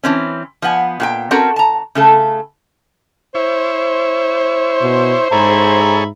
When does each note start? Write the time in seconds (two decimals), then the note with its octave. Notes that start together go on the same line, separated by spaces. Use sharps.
0.04 E3 C4 C#4
0.62 F3 B3 F#5 G#5
1.00 A#2 F#4 G5
1.31 C4 C#4 F#4 A4 A#4
1.56 A5 A#5
1.95 C#3 A3 A4
3.35 E4 C5 C#5
4.82 B2
5.32 G#2 G#4 A4 C#5 E5 A#5 B5